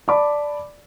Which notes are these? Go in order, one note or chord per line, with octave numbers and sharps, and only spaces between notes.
D5 A5 B5 D6